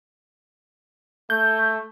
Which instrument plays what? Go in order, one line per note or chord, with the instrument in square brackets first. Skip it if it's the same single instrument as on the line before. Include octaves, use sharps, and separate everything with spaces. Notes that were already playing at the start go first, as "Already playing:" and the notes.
[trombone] A3 [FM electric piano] G6